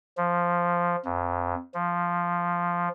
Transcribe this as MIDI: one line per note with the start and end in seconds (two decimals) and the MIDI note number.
0.17 0.96 53
1.05 1.55 41
1.74 2.89 53